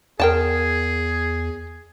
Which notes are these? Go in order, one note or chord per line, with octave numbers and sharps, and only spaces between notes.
E2 G#4 A#4 G5 A5